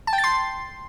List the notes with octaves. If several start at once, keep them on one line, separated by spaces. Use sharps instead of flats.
A5
G5
A6
C6